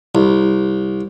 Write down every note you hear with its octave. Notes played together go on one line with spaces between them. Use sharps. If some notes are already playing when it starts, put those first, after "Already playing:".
C2